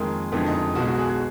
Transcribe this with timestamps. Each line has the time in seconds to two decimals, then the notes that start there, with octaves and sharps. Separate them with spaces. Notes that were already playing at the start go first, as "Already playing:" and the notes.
Already playing: F2 D#3 G#3 A#3
0.32 F#1 F2 D3 G#3 B3
0.46 D#4
0.75 B1 B2 G#3 F#4
0.87 F#4
0.98 G#4
1.09 G#4